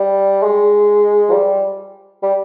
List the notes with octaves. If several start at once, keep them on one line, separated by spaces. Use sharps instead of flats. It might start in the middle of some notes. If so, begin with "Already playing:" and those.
Already playing: G3
G#3
F3
G3
G3